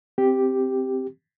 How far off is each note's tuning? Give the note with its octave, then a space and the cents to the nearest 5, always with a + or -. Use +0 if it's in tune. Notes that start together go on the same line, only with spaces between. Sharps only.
C4 -5 G4 +0